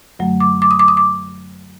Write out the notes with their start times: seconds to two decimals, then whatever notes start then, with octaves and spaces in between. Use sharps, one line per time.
0.19 F#2 D3 F#3 A3
0.40 D6
0.62 D6
0.71 D#6
0.79 D6
0.88 D#6
0.97 D6